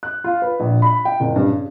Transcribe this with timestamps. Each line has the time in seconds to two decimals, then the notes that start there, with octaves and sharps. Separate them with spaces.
0.03 F#6
0.24 F4
0.42 B4
0.60 A#1
0.82 B5
1.05 G5
1.20 F#1
1.36 G2
1.48 C#3